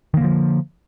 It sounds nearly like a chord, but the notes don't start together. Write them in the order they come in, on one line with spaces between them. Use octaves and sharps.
D#3 A#3 D3 F3